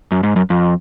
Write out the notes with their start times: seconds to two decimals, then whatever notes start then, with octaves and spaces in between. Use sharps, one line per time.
0.12 F#2
0.23 G#2
0.36 F#2
0.50 F2